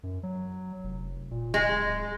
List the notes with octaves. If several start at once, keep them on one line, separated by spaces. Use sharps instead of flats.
F#2
F#3
F1
A#2
D1 G#3